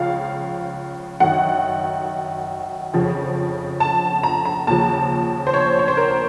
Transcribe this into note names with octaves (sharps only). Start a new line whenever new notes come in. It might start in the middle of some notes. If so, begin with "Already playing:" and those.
Already playing: C#2 C#3 F3 F5
F#2 D#3 F#5
F2 C#3 F3
A5
A#5
A#5
D#2 C#3 F3 A5
C5
C#5
C#5
C5
A#4